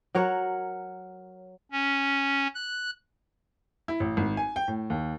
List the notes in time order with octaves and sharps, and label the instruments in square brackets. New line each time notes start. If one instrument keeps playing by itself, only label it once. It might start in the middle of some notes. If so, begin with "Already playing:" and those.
[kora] F#3 A#4 C#5 F#5
[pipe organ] C#4
F#6
[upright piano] E4
A1
G#1
G#5
G5
A2
D#2